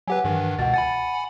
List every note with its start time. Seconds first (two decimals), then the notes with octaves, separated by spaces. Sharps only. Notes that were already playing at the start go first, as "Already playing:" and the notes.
0.08 F#3 G4 B4 F#5 G#5
0.24 G2 D#3 E3
0.58 C#2 B2 F#5 A6
0.74 F#5 G#5 B5 A6